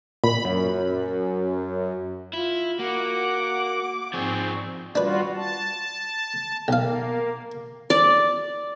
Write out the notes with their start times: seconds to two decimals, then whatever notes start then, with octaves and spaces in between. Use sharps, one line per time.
0.24 A#2 B5
0.45 F#2
2.33 E4 F4
2.79 A#3 F#4 F#5 D6
4.13 G#2 F3 C4 G#4 C#6
4.95 G3 D4 F4 F#4 B4
5.36 A5
6.68 B1 A#3 F5
7.90 D5